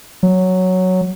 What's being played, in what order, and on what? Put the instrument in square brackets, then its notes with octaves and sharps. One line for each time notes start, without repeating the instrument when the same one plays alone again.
[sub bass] F#3